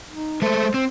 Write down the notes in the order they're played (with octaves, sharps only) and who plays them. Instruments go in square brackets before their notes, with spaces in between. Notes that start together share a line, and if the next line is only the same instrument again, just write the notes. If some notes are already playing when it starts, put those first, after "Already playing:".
[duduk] D#4
[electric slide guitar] G#3 A3 A4 [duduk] C5
[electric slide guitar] C4